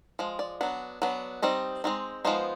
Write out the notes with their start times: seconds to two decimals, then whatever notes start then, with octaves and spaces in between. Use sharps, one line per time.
0.19 F3 G#3
0.39 D5
0.61 F#3 B3 D4
1.02 F#3 B3 D4
1.42 G3 C4 D#4 D#5
1.84 G#3 C4 D#4
2.25 F3 G#3 B3 D#4 C5